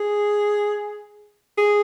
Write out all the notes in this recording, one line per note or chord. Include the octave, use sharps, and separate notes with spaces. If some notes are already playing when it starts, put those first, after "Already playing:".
Already playing: G#4
G#4